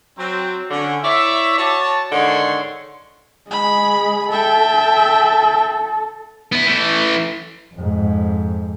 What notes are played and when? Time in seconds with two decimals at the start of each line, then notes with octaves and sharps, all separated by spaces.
0.19 F#3 C4
0.71 D3 C#4
1.04 E4 C#5 D5 E5
1.59 F#4 C#5 D5 A5
2.12 G#2 D3 D#3 C5 C#5 C6
3.51 G#3 G#4 B5
4.30 A4 E5 G5
6.52 B3 E4
6.67 E3 A3
7.75 F2 G#2